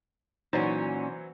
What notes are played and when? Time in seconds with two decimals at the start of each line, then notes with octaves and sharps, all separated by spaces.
0.53 A#2 E3 F#3 C#4 D#4 F#4 C5